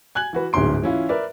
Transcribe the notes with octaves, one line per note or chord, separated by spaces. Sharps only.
G#5 F#6 G#6 F#7
E3 F#4 B4
D1 D2 G#2 C#4 C6 D7
E3 C#4 E4 F4
A#4 B4 D5 E5